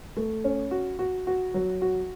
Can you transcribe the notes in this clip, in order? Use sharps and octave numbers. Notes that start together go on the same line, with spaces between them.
A3
C#4
F#4
F#4
F#4
F#3
F#4